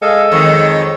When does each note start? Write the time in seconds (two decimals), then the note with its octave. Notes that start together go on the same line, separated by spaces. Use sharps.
0.02 G#3 A4 D#5 F5 G#5
0.32 F2 D#3 C#5